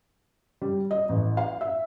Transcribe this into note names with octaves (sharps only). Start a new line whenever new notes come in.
G3
D#5
A1
F5
E5